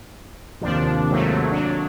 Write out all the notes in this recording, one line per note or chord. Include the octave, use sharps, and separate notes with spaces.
D#2 C3 F3 D4
G#2 F#3 A3
F#3 D4